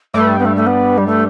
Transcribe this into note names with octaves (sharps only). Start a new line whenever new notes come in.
G2 G3 A3
B3
A3
A3
B3
G3
A3